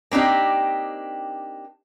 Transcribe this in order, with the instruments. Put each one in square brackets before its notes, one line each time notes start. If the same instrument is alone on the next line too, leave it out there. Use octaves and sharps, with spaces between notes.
[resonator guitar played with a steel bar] A#3 C4 D4 D#4 G4